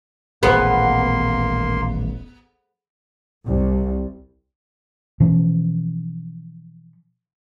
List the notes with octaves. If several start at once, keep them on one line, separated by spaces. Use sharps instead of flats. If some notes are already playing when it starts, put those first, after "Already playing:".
D#1 A1 A#2 A#3 B3 G#4 B4 C6
C2
B2 E3 F3 C#4